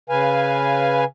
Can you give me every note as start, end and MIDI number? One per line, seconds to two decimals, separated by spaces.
0.10 1.04 49
0.10 1.04 71
0.10 1.04 77
0.10 1.04 80